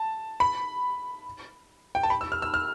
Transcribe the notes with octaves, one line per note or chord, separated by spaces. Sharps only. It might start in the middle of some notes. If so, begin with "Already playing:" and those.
Already playing: A5
B5
G5
A5
B5
E6
F6
E6
F6